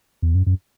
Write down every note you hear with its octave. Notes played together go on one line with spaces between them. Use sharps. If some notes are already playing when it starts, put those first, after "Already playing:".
E2
F#2
F#2